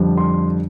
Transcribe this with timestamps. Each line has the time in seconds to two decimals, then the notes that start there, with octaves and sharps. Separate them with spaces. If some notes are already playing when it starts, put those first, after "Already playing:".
Already playing: F2 D3 G3 D4
0.17 C6